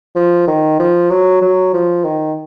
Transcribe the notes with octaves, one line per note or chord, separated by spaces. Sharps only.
F3
D#3
F3
F#3
F#3
F3
D#3